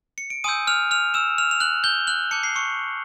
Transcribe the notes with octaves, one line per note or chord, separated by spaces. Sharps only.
C#7
D7
G#5 C6 D#6 E6 G6 D#7
F6 F7
F6 F7
E6 E7
F6 F7
F7
F#6 F#7
G6 G7
F#6 F#7
A5 D6 G6 C#7
C7
C#6 C#7